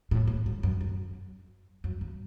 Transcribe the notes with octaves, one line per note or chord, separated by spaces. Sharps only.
A2
A2
G#2
F#2
F#2
F#2
G2